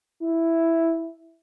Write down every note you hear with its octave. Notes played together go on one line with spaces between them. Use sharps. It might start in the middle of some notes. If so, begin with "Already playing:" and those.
E4